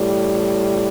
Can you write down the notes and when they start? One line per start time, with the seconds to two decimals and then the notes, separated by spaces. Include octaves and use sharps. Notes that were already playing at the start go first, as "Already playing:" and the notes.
Already playing: A2 G3